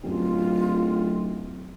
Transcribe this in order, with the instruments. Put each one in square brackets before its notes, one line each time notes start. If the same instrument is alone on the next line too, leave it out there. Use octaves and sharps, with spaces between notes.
[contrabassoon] D1 [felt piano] F#2 G4 [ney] F4